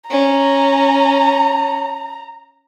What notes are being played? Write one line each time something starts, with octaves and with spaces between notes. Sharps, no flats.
C#4 A#5